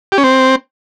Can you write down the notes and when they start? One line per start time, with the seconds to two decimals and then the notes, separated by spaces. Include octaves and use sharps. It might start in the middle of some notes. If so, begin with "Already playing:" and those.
0.12 G4
0.18 C#4
0.24 C4